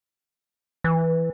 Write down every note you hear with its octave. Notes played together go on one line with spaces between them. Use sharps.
E3